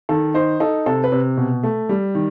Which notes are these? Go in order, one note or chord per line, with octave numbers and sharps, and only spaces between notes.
D#3 A4
D#4 C5
D#4 A4
C3 A4
B4
C3
B2
A3
G3
D#3